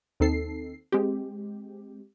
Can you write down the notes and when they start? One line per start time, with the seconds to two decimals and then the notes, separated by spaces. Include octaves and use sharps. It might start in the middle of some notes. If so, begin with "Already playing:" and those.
0.20 D#2 C4 D#4 A4 C7
0.92 G#3 C4 G4